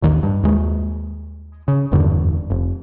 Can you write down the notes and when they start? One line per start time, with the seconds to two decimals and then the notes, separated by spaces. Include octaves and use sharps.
0.02 A1 D#2 D#3
0.23 G2
0.43 D#2 G#3
1.68 C#3
1.92 F#1 E2 G2 D3
2.50 F1